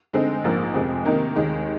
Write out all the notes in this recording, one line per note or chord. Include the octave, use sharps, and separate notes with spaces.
D3 G#3 C4 D#4
A#1 G#2 F3 A#3
F2 C3 F3 G#3
C3 D#3 A#3 D#4 A#4
D#2 D#3 G#3 D#4